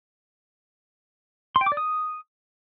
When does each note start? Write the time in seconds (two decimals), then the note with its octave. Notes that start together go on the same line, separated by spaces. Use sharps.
1.56 C6
1.61 G5
1.66 D6
1.72 D5
1.77 D#6